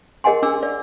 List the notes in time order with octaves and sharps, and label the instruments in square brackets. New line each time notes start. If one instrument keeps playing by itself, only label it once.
[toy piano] G#4 A#4 D#5 F#5 G#5 C6
D4 D6 E6
D5